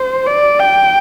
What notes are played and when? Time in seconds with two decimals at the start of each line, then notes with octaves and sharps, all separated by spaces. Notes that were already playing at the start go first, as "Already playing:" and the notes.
Already playing: C5
0.26 D5
0.59 G5